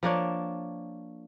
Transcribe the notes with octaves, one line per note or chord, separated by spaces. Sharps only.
F3 A#3 D4 C#5